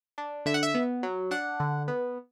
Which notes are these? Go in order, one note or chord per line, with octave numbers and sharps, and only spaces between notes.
D4
D3 E5
F#5
E5
B3
F#3
D4 F#5
D3
B3